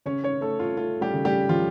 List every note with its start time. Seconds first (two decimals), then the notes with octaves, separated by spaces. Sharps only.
0.05 C#3 C#4 C#5
0.24 C#4 C#5
0.41 A3 A4
0.59 F4
0.77 A3 F4
1.01 G3 G4
1.13 C#3
1.25 G3 G4
1.49 F3 F4